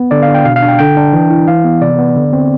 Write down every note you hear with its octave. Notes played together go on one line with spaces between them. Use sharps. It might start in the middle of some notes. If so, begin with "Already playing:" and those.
Already playing: B3
D3 D5
F5
D4
G5
B2 F5
F5
D4
G5
D3 G5
D4
E3
E4
E3 F5
B3
C3 D5
B3
D3
C4